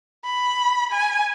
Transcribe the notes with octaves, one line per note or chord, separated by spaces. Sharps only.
B5
G#5